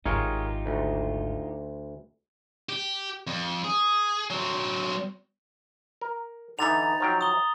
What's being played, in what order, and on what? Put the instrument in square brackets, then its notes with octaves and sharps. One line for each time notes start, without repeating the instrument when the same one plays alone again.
[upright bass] G#1 G#2 [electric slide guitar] D#4 F4 G4 [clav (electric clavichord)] G#4 A#4 C#5
[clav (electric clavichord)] D2
[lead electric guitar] G4
F2
G#4
F#3 C4
[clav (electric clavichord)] A#4
[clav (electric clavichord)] D3 E3 [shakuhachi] D#4 [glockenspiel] A#5 A6 F7
[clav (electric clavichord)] F3 F#3 G5
[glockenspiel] D#6 G7